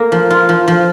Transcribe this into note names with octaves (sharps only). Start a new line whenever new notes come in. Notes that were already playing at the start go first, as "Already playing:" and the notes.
Already playing: A#3
F3
F4
F3
F3